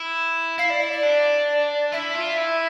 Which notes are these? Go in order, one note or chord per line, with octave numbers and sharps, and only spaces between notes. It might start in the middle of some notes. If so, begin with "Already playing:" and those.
Already playing: E4
E4 F5
D5
D5
D5
D4
E4 E5
F4
E4